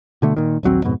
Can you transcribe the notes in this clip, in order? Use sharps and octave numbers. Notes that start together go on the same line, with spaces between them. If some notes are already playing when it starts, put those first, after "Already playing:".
B2 D3 A3
A#2 D#3
A#1 D#2 F#3 C4
F2 G#2 B2